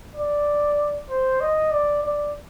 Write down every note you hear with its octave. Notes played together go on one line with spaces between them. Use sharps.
D5
C5
D#5
D5
D5